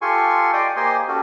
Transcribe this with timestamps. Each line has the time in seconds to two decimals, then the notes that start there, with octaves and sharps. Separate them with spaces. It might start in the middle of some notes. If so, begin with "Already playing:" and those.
0.02 F4 G4 A4 G#5 C6 C#6
0.53 D5 D#5 G5 C6 D#6
0.76 A#3 G4 C5 D#5 G#5 C6
1.08 C#4 F#4 G4 A4